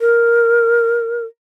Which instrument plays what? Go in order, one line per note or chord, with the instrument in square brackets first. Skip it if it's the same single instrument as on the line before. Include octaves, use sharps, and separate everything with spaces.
[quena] A#4